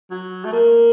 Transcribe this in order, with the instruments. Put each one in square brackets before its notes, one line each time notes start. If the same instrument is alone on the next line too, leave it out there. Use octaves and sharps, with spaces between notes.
[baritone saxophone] F#3
A3
A#3